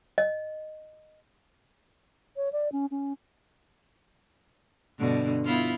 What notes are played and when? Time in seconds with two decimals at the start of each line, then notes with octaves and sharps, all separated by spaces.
0.18 D#5
2.36 C#5
2.52 D5
2.72 C#4
2.91 C#4
4.98 G2 B2 D3
5.45 B3 E4 F4